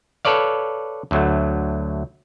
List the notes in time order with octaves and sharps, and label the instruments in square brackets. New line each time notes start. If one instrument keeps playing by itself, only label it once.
[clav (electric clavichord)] A4 B4 C#5 D5 F5
D2 F#3 A3